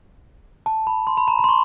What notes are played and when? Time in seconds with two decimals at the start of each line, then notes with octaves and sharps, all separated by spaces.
0.66 A5
0.87 B5
1.07 C6
1.17 B5
1.28 A#5
1.39 B5
1.44 C6
1.49 C#6